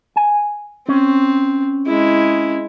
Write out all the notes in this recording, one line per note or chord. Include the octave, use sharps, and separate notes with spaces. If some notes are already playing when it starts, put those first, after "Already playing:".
G#5
C4 C#4
G#3 E4